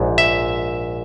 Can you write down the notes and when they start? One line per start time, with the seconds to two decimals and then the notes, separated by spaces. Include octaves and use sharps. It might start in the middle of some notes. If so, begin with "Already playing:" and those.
Already playing: A#1 G#2
0.18 E5